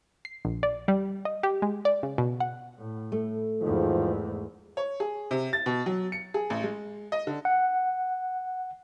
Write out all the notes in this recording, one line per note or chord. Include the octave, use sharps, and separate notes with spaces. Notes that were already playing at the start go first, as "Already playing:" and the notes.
C7
A#1
D5
G3
D#5
G4
G#3
D5
C#3
B2
F#5
A2
A3
E2 G#2 D#3 F3
C#5
G#4
C3
A6
B2
F#3
C#7
G#4
A1
G#3
D#5
D3
F#5